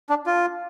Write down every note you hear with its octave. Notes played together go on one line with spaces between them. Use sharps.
D4
F4